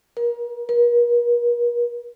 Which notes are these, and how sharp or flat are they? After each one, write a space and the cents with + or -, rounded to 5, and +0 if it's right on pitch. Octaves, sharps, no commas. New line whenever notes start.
A#4 +30
A#4 +45